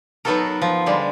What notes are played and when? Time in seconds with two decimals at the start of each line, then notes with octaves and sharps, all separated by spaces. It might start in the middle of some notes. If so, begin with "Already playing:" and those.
0.25 F#3 B3 D#4 F#4 A4 A#4
0.62 F3
0.86 D3 G3 G#3